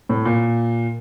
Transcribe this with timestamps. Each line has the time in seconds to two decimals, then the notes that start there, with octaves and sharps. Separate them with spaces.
0.09 A2
0.25 A#2